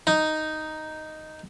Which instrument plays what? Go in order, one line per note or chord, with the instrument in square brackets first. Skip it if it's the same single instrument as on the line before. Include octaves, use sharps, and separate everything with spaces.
[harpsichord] D#4